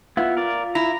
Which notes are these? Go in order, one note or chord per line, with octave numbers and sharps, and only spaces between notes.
B3 E4 F4 F5
A#4 D5
E4 A#5